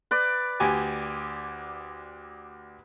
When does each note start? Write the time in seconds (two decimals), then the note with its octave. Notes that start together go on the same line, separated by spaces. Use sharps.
0.11 B4 D5
0.60 D2 G4 G#5